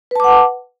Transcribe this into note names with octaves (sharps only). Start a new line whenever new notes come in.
B4 F#5 A5 D6